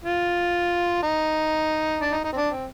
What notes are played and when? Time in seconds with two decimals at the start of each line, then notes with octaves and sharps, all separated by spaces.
0.04 F4
1.03 D#4
2.01 D4
2.12 D#4
2.24 D#4
2.32 C4
2.37 D4
2.49 C4